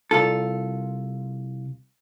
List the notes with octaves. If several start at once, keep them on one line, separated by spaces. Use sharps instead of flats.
C2 F4 A4